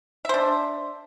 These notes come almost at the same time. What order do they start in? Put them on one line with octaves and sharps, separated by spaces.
E5 C5 D4